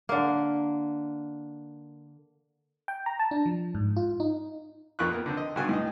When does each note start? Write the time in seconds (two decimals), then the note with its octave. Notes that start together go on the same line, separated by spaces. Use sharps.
0.09 D3 A#3
2.88 G5
3.06 A#5
3.19 A5
3.31 D4
3.46 F3
3.75 G#2
3.96 F4
4.20 D#4
4.99 F2 A#2 A#4 B4 C#6 F#6
5.12 B3 A#4
5.26 D3 C4
5.37 D#5
5.56 G2 B2 D3 F#4 G#5
5.69 A2 D#5